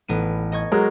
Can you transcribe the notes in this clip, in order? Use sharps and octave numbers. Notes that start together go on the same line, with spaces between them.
A1 B3 D#7
D#5 C#6 G#6
F#3 G#3 A#4